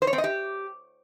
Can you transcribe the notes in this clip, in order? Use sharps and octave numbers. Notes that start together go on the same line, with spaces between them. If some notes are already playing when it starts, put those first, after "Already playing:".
C5
C#5
C4
D#5
G4